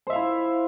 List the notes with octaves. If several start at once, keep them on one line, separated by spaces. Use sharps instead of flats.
E4 C5 E5 F5